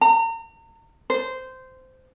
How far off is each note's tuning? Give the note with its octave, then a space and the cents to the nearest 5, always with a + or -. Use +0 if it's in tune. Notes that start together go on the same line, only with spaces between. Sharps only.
A#5 -35
C5 -15